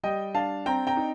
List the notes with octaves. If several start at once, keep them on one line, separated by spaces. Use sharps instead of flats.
G3 D#5 G5
D4 F5 A5
C4 G5 A#5
G5 A#5
D#4